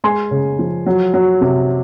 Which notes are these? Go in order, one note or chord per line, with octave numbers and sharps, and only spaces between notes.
G#3 G#5 C6
C#3
F3
F#3
F#3
C3